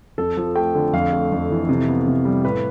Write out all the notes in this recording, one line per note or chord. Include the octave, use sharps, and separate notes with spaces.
F2 A4
F3
A3 G5
D3
F2 F5
A3
F2
E3
C3
B3
C3
G3
A2 B4